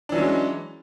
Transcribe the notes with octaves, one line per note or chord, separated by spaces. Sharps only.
E3 F#3 G#3 C#4 D4